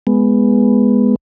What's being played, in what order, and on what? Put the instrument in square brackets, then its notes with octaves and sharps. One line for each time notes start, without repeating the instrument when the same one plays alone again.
[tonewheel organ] G#3 B3